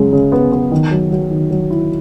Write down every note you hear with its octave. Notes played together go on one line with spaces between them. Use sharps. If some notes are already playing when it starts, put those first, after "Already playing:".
Already playing: F#2 C#3 G#3
C#3
B3
B3
D#3
F#3
F#3
D#3
F#3
E4